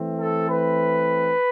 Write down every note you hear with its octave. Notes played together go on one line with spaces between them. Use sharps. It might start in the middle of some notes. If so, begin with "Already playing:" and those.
Already playing: E3 A3 C4
A4
B4